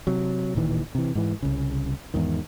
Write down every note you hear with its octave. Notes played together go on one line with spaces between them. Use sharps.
C3 F#3
D1 A#2 D#3 E3
C3 E3
G#2 E3
C2 C#3
E2 G#2 D#3